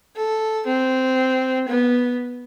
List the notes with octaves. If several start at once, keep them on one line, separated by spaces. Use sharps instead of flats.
A4
C4
B3